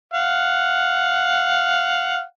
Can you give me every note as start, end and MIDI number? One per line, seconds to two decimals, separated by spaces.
0.14 2.22 77
0.14 2.22 78